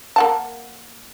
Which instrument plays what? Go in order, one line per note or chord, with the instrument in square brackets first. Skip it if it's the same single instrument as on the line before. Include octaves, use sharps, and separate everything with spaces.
[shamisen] A#3 F#5 A5